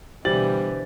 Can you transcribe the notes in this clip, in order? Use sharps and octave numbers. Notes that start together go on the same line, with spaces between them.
B2 D3 E3 G3 G4 C5 A6 F#7